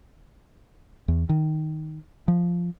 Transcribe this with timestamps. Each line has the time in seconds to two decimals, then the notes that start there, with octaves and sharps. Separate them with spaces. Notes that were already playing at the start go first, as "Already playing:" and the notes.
1.08 E2
1.29 D#3
2.28 F3